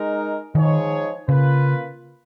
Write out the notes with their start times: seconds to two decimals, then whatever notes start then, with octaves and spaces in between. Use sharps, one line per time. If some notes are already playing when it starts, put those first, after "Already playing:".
Already playing: G#3 D#4 A#4
0.55 D#3 F3 G#3 D#4 G#4 C#5
1.29 C#3 A#3 F4 B4